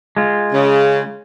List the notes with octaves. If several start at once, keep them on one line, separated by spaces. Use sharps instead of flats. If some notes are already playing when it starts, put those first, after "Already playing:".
G#3 F4
C#3